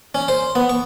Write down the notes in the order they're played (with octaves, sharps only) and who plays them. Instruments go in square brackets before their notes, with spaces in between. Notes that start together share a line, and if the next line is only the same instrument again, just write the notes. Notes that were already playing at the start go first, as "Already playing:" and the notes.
[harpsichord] C#4
C5
B3
C#6